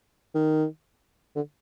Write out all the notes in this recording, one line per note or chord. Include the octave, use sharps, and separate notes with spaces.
D#3
D3